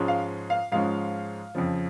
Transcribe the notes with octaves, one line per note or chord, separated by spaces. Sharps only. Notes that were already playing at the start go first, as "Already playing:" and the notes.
Already playing: G#2 F3 G#3 C#4
F5
F5
G#2 F3 G#3 C#4 F5
F2 C#3 F3